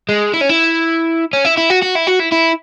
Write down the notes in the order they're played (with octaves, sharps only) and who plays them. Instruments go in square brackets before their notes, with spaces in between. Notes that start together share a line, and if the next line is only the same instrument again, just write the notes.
[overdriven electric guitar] G#3
E4
C#4
E4
C#4
E4
E4
F#4
F#4
E4
F#4
E4
E4